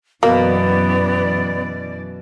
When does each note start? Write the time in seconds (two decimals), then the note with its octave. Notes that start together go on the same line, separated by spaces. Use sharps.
0.23 F#2 B2 E3 A#3 B3 D5